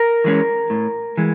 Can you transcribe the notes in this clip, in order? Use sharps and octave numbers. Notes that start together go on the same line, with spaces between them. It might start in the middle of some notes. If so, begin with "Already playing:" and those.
Already playing: A#4
E3 G#3 C#4
A2
E3 G#3